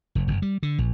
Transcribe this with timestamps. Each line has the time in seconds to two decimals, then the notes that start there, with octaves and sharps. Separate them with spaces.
0.15 F1
0.27 F#1
0.42 G3
0.63 D3
0.78 A#1